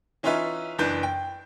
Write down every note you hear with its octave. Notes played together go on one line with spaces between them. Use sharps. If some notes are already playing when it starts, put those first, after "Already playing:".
E3 C#4 D#4 F4 B4 E5
F#1 E3 D4 B4 G6
G5